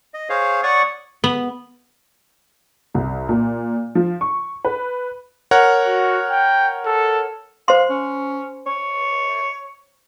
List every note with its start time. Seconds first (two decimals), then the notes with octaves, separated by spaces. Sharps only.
0.14 D#5
0.30 G#4 C5 C#5 F5
0.63 C#5 D5 F#5 C#6 D#6
1.24 B3
2.94 C2
3.29 A#2
3.95 F3
4.21 C#6
4.65 B4
5.51 A#4 C#5 F#5
5.86 F#4
6.31 G5
6.86 A4
7.68 C5 F5 C6
7.89 C#4
8.66 C#5